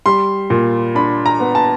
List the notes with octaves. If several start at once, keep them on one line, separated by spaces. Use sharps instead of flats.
G3 C6
A#2
D4 B5
A#5
B3
A5